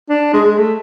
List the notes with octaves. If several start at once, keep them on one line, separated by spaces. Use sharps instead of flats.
D4
G#3
G#3
A3